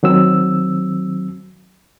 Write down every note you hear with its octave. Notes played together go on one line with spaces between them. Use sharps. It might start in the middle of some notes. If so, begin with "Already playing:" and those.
D#3 F#3 C4 E6